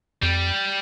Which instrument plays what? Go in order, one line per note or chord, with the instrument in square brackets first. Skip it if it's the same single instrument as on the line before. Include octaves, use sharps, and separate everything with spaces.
[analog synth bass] F2 [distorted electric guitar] G3